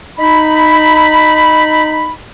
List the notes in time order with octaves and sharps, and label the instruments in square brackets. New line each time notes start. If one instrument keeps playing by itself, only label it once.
[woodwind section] D#4 B5